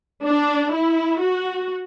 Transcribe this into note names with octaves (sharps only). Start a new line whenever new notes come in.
D4
E4
F#4